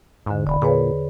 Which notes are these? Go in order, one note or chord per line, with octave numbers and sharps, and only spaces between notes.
E2 G#2 D3
E1 D5 B5
A#2 G#4 B4 C#5